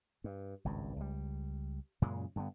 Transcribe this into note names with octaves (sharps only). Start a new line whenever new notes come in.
G2
G#1 C#2 G2
C#2 G3
F#2 A#2 C#3 G#3
G2 D3 B3